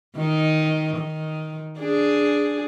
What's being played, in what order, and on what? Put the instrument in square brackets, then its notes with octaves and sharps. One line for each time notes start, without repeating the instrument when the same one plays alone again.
[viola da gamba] D#3 D#4
D#3
D4 G#4